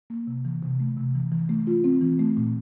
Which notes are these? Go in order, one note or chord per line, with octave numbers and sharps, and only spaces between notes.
A#3
C3
E3
C3
A3
C3
E3
E3
A3
F4
C4
E3
A3
A#2